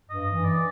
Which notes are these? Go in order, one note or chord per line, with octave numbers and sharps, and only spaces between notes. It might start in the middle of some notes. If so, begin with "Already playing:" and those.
G2 D#5
E3
D5